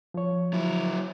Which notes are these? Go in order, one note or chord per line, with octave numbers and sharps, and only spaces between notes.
F3 C#5
F#3 E4